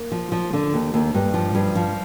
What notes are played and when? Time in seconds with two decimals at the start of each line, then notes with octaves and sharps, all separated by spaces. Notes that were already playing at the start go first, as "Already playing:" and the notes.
Already playing: A#3
0.12 F3
0.32 F3
0.53 D3
0.74 D#2
0.94 D#2
1.14 G2
1.34 F3
1.55 G2
1.75 F3